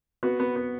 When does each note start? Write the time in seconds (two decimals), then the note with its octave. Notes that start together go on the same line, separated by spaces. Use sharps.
0.23 B3 F#4
0.40 B3
0.56 B3